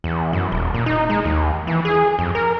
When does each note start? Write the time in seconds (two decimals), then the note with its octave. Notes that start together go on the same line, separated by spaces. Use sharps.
0.04 E2
0.33 F#2
0.52 D#1
0.74 A#2
0.86 D#4
1.09 G#3
1.25 D#2
1.67 E3
1.85 G#4
2.19 F2
2.35 A#4